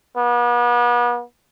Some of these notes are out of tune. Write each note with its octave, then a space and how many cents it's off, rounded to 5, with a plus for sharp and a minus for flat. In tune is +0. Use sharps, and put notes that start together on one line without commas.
B3 -40